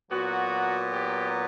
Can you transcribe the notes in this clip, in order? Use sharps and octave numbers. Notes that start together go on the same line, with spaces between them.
A#2 F#3 B3 F#4
G4